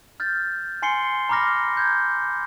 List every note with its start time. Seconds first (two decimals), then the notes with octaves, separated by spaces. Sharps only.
0.20 F6 G6 A6
0.82 G#5 C6 C7 C#7 G7
1.29 A#5 B5 D6 F6 A#6
1.75 A#5 G6 G#6